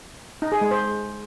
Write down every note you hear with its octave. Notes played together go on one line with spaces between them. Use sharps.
D#4
G#4
G#3
C5